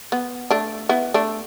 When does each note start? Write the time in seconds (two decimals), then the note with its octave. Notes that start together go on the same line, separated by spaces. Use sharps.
0.12 B3
0.50 A3 D4
0.89 B3 E4
1.14 A3 D4